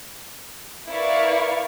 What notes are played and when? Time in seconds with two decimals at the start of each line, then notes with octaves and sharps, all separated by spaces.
0.88 E4 A#4 B4 D5 F5 C#6